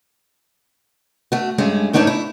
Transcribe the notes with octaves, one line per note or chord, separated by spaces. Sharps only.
A3 F#4
G2 G#3 A3 C#4
G#2 A3 D4 D#4 C#5 A5
E4